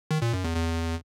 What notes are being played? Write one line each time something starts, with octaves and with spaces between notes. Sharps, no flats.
D#3
A#2
F#2
E2
E2